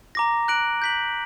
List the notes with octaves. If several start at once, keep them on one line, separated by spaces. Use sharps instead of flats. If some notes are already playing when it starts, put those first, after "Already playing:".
A#5 D6 A#6
F#6 A#6 D7 F#7
G6 B6 F#7